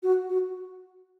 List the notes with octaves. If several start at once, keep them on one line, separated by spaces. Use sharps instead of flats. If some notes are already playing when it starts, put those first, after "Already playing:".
F#4
F#4